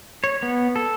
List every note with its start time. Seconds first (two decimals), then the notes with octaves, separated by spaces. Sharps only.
0.24 C#5
0.43 B3
0.76 A4